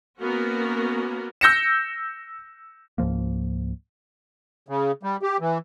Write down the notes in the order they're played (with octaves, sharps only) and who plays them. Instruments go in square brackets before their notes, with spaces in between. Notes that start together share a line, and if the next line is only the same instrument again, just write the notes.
[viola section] A#3 B3 C#4 F#4 A#4
[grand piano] E6 G6 A#6 C#7 E7
[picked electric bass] C#2 G#2 F3 A#3
[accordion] C#3
G3
G4
E3